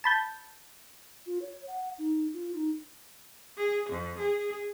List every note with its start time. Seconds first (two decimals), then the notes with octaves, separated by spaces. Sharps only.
0.04 A5 B5 G6
1.26 F4
1.42 C#5
1.67 F#5
1.98 D#4
2.34 F4
2.55 D#4
3.58 G#4
3.90 F2
4.19 G#4